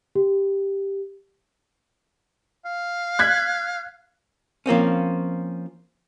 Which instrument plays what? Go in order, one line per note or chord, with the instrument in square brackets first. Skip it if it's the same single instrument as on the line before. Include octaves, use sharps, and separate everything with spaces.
[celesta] G4
[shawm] F5
[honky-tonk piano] F#6 G#6 B6
[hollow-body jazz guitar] F3 A#3 C4 C#4